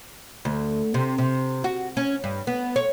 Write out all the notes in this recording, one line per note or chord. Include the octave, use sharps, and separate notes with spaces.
D2
C3
C3
F#4
C#4
G2
B3
C#5